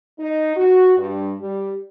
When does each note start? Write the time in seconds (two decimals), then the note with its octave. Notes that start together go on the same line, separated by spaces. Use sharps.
0.19 D#4
0.56 F#4
0.97 G2
1.41 G3